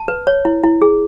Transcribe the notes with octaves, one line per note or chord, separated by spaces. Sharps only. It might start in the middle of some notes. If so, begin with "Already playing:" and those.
Already playing: A5
B4
C#5
E4
E4
G#4